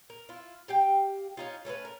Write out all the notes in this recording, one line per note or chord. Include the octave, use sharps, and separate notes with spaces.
A#4
E4 F4
G4 F5 G5
C#4 D#4 F4
A3 C#4 A4 B4
A#4